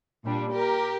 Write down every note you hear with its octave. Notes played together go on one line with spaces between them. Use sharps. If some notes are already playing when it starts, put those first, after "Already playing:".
A#2 G3 D4
G4 A#4